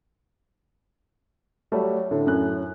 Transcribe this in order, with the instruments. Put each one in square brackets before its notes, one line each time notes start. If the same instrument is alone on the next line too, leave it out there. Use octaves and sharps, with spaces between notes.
[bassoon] F#3 [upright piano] G3 A3
[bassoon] A2 [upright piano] D3
[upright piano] F#2 C#4 F#6